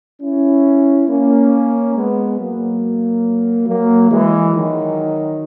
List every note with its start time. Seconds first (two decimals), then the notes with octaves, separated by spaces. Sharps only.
0.21 C#4 E4
1.08 A#3 C#4
1.94 G#3 B3
2.38 F#3 A#3
3.67 F#3 A#3
4.10 E3 G#3
4.54 D#3 F#3